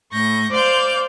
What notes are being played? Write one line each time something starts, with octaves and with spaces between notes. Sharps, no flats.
A2 C#6 G6 A#6
C5 D5 F5 C6 F6 G6